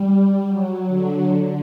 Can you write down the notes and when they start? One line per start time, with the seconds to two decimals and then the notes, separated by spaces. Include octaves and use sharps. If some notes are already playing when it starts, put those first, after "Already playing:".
Already playing: G3
0.46 F#3
0.88 D3
1.31 D3